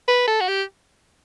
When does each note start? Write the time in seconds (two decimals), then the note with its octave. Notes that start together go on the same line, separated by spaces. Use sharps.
0.08 B4
0.28 A4
0.41 F#4
0.48 G4